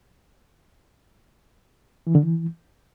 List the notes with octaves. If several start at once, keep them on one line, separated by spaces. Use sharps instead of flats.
E3
D3
E3